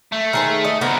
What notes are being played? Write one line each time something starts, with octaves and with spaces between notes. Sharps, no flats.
A3
D#3 G#4 C5
D#5
C2 D3 B3 A#4